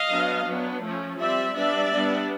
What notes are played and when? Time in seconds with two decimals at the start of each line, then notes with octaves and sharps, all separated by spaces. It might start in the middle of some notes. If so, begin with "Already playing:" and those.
Already playing: D#5 F5
0.10 F#3 B3 D4
0.47 F#3 B3 D4
0.83 F3 A3 C#4
1.19 G3 C4 D5 E5
1.55 G3 B3 D4 D5 E5
1.91 G3 B3 D4